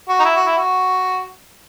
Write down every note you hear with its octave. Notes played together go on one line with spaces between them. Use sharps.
F#4
D#4
E4
F#4
E4
F#4